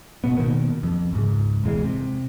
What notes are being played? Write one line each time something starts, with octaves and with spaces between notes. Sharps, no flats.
F1 B2 B3
B2 D#3 A#3
F2
C#2 G#2
E1 E2 E3 G#3
C3